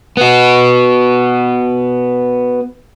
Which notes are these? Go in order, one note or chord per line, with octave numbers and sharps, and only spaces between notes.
B3 F#4